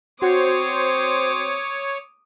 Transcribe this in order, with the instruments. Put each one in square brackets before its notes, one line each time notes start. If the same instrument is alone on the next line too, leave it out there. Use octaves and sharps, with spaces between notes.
[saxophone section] C4 C5 [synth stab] F#4 [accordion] C#5 [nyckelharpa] D6 D#6